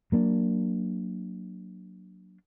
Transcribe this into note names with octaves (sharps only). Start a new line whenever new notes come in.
F#3 A#3 D4